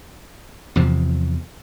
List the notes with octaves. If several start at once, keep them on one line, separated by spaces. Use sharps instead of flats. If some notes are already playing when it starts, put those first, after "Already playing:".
E2 C3 F3